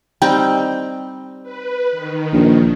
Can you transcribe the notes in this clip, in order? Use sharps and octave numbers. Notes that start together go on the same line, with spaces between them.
G3 C4 D#4 G5
B4
D#3
A#1